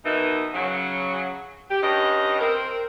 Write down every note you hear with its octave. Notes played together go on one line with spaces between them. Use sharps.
B2 D#3 E3 D#4
C#3 F#3
G4
G2 C#4 D#4 G4 D#5
C4 A#4